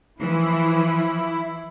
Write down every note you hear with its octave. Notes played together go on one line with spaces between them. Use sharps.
E3 F3 E4